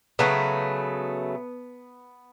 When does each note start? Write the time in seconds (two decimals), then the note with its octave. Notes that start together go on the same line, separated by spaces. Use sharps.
0.19 C#3 F#3 A3 B3